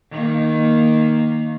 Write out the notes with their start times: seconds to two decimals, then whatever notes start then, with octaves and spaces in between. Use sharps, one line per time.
0.12 D#3 A#3